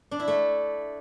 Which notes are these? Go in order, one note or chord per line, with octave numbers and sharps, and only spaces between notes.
D4
E4
A3